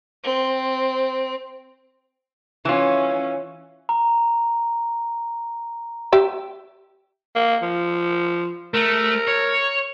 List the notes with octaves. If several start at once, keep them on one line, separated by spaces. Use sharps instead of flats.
C4
E3 C#4 F4
A#5
G4 E5
A#3
F3
A3 A#4
C#5